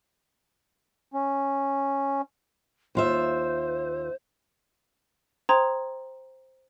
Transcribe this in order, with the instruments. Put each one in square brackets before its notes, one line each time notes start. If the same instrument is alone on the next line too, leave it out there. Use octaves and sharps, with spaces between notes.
[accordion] C#4
[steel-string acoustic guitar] D#2 F4 E5 [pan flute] C5
[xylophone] C5 G5 A#5 C6 D#6 G#6